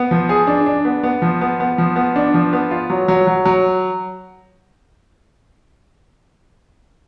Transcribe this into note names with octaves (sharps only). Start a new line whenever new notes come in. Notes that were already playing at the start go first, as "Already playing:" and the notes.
Already playing: B3
F3
G#4
D4
D4
B3
B3
F3
B3
B3
F3
B3
D4
F3
B3
F4
F#3
F#3
F#3
F#3